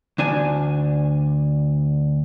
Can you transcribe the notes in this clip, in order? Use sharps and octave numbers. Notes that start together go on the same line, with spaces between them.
D2 D4 G#5